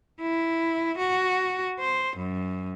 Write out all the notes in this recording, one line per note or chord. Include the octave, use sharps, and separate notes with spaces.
E4
F#4
C5
F#2